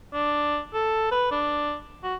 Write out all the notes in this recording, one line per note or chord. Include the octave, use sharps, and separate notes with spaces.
D4
A4
B4
D4
F#4